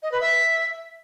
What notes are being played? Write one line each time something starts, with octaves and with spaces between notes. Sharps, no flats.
D#5
B4
E5